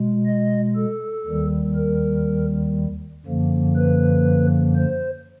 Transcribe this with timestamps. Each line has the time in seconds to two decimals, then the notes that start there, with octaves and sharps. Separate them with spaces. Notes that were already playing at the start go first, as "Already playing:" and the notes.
Already playing: B2 G#3
0.26 D#5
0.76 A4
1.26 D#2 D#3 G3
1.75 A#4
3.26 F#2 D3 F3 A#3
3.76 B4
4.75 C5